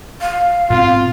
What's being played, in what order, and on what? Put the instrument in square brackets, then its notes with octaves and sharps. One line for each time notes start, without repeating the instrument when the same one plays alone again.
[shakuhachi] F5
[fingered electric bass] G#2 B2 C4 [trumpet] F4